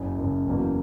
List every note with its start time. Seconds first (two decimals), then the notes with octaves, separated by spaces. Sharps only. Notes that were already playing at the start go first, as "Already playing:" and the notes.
Already playing: F#1 F#2 C#3
0.17 F#1 F#2 C#3
0.46 F#1 E2 C#3 F#3 A#3